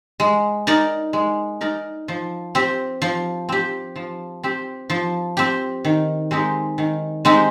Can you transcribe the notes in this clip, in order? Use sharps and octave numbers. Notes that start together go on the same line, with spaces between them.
G#3
D#4 A#4 D5
G#3
D#4 A#4 D5
F3
C4 G4
F3
C4 G4
F3
C4 G4
F3
C4 G4
D#3
G#3 C4 D#4 G4
D#3
G#3 C4 D#4 G4